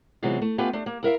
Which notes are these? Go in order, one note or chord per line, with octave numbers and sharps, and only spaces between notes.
C3 E3 F#3 G#3 B3 F4
A3
A3 B3 F4 G4 B4 G#5
A3 D4
A#3
E4 A#4 E5 F5